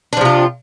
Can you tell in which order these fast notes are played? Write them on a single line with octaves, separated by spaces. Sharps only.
D4 F3 C3 F4